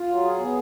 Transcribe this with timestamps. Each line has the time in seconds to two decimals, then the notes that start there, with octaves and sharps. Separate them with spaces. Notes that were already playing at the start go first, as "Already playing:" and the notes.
Already playing: F4
0.09 F#3
0.24 G#4
0.39 B3